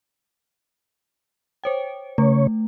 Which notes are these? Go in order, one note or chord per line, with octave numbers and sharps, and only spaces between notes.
C5 C#5 G5
C#3 A3 C#5